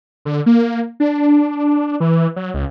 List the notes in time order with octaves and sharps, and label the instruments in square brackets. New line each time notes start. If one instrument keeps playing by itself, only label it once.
[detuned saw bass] D3
A#3
D4
E3
F#3
C#2